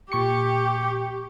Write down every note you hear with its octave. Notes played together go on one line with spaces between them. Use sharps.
A#2 G4 C#6 C#7